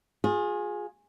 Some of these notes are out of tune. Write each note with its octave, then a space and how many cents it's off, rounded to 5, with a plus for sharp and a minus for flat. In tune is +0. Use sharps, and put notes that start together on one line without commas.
F4 +35 G#4 +0